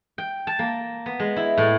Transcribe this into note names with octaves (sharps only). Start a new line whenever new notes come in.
G5
A5
A#3
B3
G#3
E4
A2